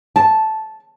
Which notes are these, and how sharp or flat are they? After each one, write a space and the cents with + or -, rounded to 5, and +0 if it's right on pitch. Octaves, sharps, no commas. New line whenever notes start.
A5 -10